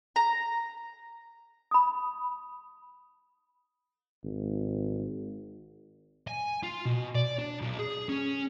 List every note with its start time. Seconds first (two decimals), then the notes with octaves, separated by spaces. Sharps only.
0.16 A#5
1.71 B5 D#6
4.24 G#1
6.27 G#5
6.63 F4
6.85 B2
7.15 D5
7.39 D4
7.62 B1
7.79 G#4
8.09 C#4